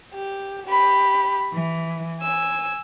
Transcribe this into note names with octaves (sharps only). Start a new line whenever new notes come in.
G4
G4 B5
E3
G#5 E6